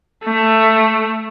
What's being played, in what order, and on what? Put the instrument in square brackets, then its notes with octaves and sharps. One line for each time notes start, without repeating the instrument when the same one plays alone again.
[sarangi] A3